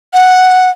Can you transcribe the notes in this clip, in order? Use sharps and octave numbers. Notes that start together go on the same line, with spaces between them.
F#5